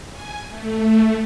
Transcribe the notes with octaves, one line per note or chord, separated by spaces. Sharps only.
G#5
A3